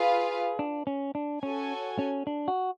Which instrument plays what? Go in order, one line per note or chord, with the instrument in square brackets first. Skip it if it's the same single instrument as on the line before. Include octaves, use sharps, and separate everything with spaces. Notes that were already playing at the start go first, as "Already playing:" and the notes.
Already playing: [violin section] F4 B4 F5 [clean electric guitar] G#4
[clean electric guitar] D4
C#4
D4
[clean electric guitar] C#4 [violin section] F#4 A4 C#5 G#5
[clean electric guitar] C#4
D4
F#4